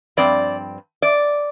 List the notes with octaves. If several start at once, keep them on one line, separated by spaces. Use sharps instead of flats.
G2 F3 C4 D5
D5